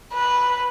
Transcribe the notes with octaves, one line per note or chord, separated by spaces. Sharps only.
B4